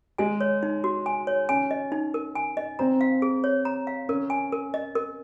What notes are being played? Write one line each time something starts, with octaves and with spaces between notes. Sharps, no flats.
G#3 G#5
C#5
D#4
F#4
G#5
C#5
C#4 G#5
D#5
D#4
A#4
G#5
D#5
C4 A#5
F5
G#4
C#5
A#5
F5
C#4 A#4
G#5
A#4
D#5
A#4